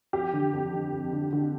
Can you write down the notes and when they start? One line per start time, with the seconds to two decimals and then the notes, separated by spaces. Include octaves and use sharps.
0.13 F2 G4
0.33 D3
0.53 F2
0.73 D3
0.93 F2
1.13 D3
1.33 D3